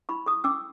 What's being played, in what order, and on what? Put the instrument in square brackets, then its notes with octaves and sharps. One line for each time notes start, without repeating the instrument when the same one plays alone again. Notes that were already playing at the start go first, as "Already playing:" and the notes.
[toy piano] E4 B5 C#6
A4 C#6 D#6
C#4 D6 E6